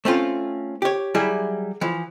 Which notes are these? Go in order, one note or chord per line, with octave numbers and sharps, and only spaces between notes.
A3 C4 C#4 F4
G4 C#5
F#3 G3 E4 G#4
E3 F3